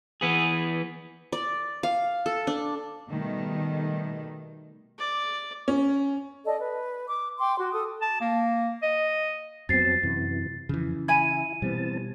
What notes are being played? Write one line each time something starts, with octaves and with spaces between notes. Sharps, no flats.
E3 B3 G#4
D5
F5
A4
D4
B2 D#3 G3 A3
D5
C#4
A4 D5 D#5
B4
D6
G5 C6 D6
F#4 C6
A4 D#6
A5
A#3
D#5
F2 F#3 B3 C4 A5 A6 C7
F#2 C3 E3
F2 C#3 E3
E4 G#5 B5 G#6 D#7
B2 E3 G3 C4 A5